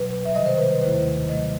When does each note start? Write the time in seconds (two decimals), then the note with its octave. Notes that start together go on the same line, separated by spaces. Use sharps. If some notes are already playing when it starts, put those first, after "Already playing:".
Already playing: B2 F#3 B4
0.25 E5
0.34 C3 D#3 G3 D#5
0.46 C5
0.58 B4
0.81 D#2 D#3 A3 E4 C5
1.28 C3 F#3 A3 D#5